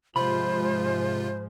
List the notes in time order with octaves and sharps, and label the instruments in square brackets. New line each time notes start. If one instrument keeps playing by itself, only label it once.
[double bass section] G#2 F3 G#3 [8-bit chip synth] C3 F4 [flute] C5 [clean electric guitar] B5